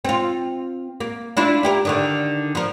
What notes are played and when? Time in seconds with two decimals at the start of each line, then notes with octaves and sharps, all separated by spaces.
0.05 C4 F4
1.00 A#3
1.37 D4 E4 F4
1.63 E4 G4 A#4
1.85 D3 D#3 D4
2.55 F3 A#4